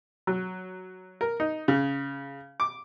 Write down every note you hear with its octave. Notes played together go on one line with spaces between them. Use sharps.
F#3
A#4
D#4
C#3
D6